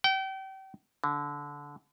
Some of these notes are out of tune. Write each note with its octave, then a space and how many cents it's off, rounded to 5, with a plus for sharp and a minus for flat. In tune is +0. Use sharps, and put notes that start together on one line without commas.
G5 -35
D3 -20